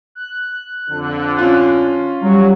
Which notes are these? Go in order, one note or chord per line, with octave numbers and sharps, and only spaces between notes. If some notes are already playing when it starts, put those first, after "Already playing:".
F#6
F2 D3
C#4 F4
F#3 G3